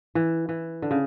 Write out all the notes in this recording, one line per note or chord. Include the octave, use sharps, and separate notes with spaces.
E3
E3
D3
C#3